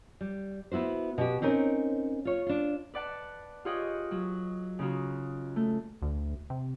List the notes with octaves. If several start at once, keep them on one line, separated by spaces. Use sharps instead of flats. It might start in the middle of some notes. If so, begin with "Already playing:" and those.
G3
B3 E4 F#4 C5
B2 F#4 G4
C4 C#4 D#4 A#4
F4 C#5
D4 F4
B4 D5 F#5 A5
F4 G4 G#4 C#5 D#5 F#5
F#3
C#3 D#4 F4 F#4
A3
D2
C3